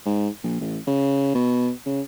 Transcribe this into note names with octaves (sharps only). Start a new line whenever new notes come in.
G#2
A#1
A1
C#3
B2
C#3